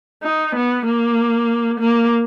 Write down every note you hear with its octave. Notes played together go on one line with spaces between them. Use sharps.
D#4
B3
A#3
A#3